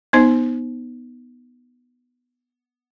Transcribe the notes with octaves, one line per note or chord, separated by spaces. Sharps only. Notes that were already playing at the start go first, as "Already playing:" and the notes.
B3 D#4 C5